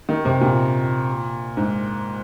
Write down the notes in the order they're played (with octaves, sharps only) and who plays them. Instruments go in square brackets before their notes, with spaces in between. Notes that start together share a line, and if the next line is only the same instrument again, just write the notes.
[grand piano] D#3
C3
A#2
G#2